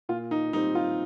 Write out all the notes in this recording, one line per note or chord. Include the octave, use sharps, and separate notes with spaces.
A#2 F4
D#4
G3 C4 D#4
F4